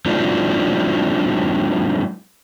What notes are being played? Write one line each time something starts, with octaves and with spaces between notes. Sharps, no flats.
F#3 G#3 C4 D4 D#4 F4